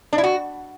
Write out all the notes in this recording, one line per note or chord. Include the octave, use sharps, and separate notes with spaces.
D4
E4
F#4